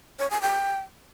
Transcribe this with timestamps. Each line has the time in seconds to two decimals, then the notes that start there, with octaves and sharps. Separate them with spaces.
0.19 C#5
0.31 G#5
0.42 G5